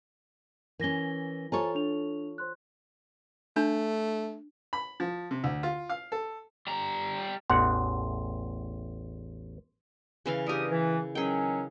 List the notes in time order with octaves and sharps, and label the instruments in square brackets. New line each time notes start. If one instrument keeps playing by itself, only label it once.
[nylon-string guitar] E3 C#4 [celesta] A#4 A#6 G7
[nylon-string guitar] F4 A4 C#5 [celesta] C5 G#5 A#5
[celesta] D4 F7
C5 C6 F#6
[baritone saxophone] A3 [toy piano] D4
[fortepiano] B5
F3
C3
D2
F4
F5
A4
[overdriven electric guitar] G3 A#5
[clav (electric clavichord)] A1 E2 F#5 [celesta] C6
[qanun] C#3 E3 F5
[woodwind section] G2 G4 D#6 [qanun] E4 A#4
[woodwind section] E3
[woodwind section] D#3 F#3 C#4 [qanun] G#4 G5